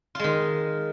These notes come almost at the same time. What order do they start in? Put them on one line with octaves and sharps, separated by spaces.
F4 G#3 D#3